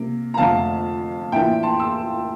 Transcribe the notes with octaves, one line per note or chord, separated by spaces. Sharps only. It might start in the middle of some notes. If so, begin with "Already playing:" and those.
Already playing: C3 A#3
A#5
F2 D3 A3 F5 A5
A2 E3 A#3 D4 F4 E5 G5
A5 C6
C6 E6